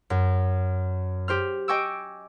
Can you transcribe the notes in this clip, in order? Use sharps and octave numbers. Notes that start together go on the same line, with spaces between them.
F#2
G4 C5 F6
D#5 G5 G#5 C#6 D6 E6